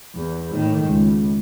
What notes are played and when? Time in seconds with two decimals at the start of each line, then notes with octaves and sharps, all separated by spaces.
0.16 E2
0.53 A2 D#3
0.86 C#2